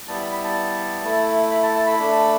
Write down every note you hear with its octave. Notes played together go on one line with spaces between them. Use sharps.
G3 B3 E4 A5
B5
B5
A5
A3 E4
B5
A5
A5
B5
A3 D4